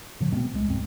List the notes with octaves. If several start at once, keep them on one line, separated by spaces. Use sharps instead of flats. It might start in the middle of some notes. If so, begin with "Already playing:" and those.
A#2 D3 F#3
B2 A3 B3 C4
C2 G#3
D1 G1 C2 C4